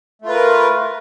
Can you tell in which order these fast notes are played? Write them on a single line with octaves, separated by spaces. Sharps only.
A3 F4 B4 A#4